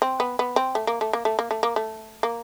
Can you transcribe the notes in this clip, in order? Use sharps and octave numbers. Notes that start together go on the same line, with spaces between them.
C4
B3
B3
C4
A3
A#3
A3
A#3
A3
A#3
A3
A#3
A3
A#3